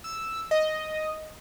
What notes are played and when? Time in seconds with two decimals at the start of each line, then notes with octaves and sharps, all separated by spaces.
0.04 E6
0.51 D#5